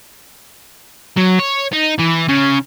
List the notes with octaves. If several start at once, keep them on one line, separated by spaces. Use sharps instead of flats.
F#3
C#5
D#4
E3
C#3